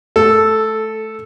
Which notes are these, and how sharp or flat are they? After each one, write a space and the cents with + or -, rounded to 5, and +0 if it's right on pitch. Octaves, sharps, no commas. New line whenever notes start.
A3 -20 A4 +0